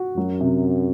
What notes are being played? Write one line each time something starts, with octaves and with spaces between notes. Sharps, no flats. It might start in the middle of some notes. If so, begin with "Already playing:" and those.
Already playing: F#4
F#2 F#3
C3